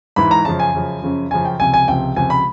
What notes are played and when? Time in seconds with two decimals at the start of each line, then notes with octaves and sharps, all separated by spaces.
0.16 G#2 E3 B5
0.31 A#5
0.45 F#2 C#3 F3 A5
0.59 G#5
0.74 F#2 C#3 F3
1.02 F#2 C#3 F3
1.31 F#2 C#3 F3 G#5
1.45 G5
1.59 C#2 C3 F3 G#5
1.74 G#5
1.88 C#2 C3 F3 G5
2.16 C#2 C3 F3 G#5
2.30 B5